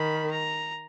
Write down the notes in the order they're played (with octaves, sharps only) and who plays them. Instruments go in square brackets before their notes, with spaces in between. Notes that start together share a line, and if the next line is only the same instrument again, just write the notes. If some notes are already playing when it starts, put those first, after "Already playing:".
Already playing: [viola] D#3 [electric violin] B5
[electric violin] A#5